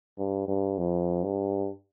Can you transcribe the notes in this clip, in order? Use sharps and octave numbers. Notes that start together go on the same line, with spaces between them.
G2
G2
F2
G2